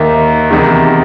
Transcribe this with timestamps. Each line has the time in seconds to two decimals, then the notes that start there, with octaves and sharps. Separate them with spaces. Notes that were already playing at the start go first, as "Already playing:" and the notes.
Already playing: D#2 D#3 E5
0.51 E2 C3 D#3